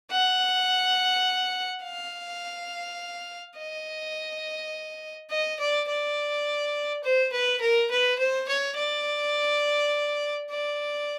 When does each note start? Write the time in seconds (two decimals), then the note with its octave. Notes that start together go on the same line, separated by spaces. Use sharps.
0.11 F#5
1.83 F5
3.58 D#5
5.30 D#5
5.59 D5
5.88 D5
7.04 C5
7.32 B4
7.61 A#4
7.91 B4
8.18 C5
8.48 C#5
8.77 D5
10.51 D5